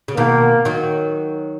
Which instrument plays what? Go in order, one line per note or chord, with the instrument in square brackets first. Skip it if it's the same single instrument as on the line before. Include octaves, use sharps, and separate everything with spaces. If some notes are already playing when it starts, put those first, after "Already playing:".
[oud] C#3
[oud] B2 D#3 [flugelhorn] A#3
[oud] D#3 F#3